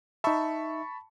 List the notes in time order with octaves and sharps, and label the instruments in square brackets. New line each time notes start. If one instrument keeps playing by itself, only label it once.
[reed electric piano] D#4 E5 [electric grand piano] A5 B5 C#6